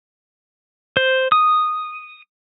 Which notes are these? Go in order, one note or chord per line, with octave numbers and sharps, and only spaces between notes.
C5
D#6